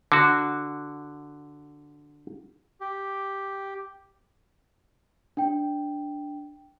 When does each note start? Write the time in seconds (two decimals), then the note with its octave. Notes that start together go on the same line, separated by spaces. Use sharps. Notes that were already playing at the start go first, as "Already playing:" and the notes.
0.12 D3 F#4
2.81 G4
5.37 D4 G5